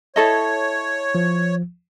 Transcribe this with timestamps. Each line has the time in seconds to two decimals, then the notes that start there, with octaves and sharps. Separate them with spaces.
0.16 E4 A4 C#5 D#5
1.15 F3